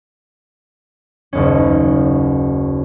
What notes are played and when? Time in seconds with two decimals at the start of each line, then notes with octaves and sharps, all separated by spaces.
1.33 F#1 D#2 C#4